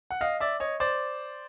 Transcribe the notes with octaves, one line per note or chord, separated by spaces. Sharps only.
F#5
D#5 F5
D5 E5
C#5 D#5
C5 D5